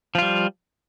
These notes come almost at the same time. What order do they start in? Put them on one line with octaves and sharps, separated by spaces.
F3 F4 G3